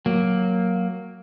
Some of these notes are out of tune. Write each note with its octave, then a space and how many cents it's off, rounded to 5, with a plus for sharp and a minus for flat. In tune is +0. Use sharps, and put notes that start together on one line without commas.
F#3 +0 A#3 +0